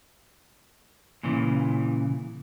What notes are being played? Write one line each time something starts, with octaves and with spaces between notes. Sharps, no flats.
A#2 C#3 E3